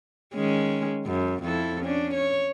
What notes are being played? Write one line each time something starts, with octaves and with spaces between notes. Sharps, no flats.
D#3 G#3 C#4
F#2
F2 E4 A4
C#4 D4
C#5